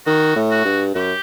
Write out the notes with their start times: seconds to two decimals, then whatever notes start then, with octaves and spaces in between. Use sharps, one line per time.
0.06 D#3 F#4
0.36 A2
0.51 F#4
0.65 G2
0.95 F#2 G4